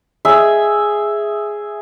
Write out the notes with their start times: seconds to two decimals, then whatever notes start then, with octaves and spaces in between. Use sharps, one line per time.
0.25 G#4 E5